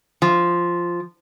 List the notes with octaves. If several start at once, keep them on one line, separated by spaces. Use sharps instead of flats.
F3